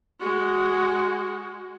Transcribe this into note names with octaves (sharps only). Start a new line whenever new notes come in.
G#3 F#4